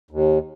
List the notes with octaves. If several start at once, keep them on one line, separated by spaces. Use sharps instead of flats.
D#2